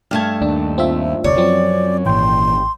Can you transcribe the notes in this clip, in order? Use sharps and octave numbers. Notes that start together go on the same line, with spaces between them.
G2 A3 A5 F6 G#6
D#2 D4
C4 F4 E5
F1 D2 C3 C#5 D5
F#2 F3 F#3 C4
G#1 A#2 E3 G5 C6